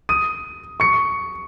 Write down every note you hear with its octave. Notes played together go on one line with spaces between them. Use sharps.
D#6 D#7
C#6 C#7